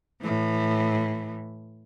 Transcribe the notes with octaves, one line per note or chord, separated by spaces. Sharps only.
A2 E3